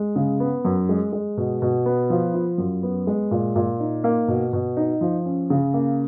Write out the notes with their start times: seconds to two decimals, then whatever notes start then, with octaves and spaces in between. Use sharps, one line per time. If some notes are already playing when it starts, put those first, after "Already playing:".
Already playing: G#3
0.16 C#3
0.40 B3
0.65 F#2
0.89 G#3
1.12 G#3
1.38 B2
1.62 B2
1.86 B3
2.10 F3
2.34 F4
2.58 F#2
2.83 B3
3.07 G#3
3.31 A#2
3.56 A#2
3.80 D#4
4.04 A#3
4.28 B2
4.53 B2
4.77 D#4
5.01 F3
5.26 C#4
5.50 C#3
5.74 A#3